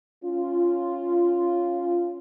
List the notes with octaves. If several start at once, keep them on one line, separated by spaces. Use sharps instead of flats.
C#4 F4